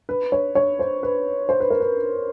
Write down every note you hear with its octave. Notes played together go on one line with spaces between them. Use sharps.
B4
C#5
C#5
C5
B4
C5
B4
A#4
B4